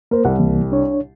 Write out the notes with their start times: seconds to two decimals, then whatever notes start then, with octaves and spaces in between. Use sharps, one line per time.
0.11 A#3 A#4 C5
0.25 C2 F#5
0.39 C#2 E3 A#3
0.72 D4 C#5